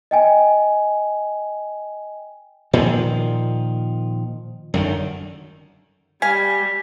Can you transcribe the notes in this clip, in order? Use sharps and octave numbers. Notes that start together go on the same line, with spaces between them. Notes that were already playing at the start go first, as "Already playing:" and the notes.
D#5 G5 G#5
A#2 D#3 F3
F#2 D3 D#3
G3 F5 G#5 B6